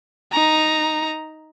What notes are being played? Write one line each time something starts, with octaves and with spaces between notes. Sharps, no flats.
D#4 A#5